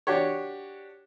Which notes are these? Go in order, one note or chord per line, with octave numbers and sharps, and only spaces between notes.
D4 F#4 G4 C#5